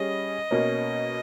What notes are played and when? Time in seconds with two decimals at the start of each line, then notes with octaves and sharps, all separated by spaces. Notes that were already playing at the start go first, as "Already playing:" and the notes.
Already playing: G3 C#4 G#4 D#5
0.51 B2 A#3 C#4